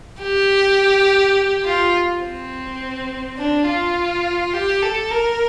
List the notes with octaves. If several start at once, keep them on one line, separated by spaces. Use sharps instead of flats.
G4
F4
C4
D4
F4
G4
A4
A#4